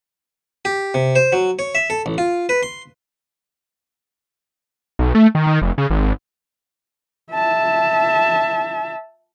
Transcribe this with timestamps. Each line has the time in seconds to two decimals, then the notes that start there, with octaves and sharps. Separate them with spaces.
0.65 G4
0.94 C3
1.15 C5
1.33 F#3
1.59 C#5
1.75 E5
1.90 A4
2.06 A1
2.18 F4
2.49 B4
2.63 C6
4.99 B1
5.15 A3
5.35 D#3
5.47 D#3
5.62 F1
5.78 C#3
5.90 G#1
7.33 E5 A5